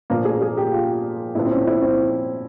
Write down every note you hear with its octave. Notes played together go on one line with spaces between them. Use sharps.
A#2 F3 A#3
G#4
G#4
G4
F4
A#2 F3 E4
C4
C#4
E4
C4